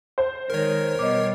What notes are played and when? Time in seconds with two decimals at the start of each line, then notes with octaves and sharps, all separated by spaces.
0.18 C5
0.50 D#3 G#3 A#4 C#5
0.99 B2 G3 D#5 D6